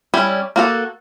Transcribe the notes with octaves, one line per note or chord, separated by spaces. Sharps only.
G3 C#4 E4
A#3 F#4 A4